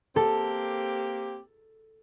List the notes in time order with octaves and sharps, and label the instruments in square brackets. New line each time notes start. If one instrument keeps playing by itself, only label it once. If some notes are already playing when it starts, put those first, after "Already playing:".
[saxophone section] A#3 C4 G4 [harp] A4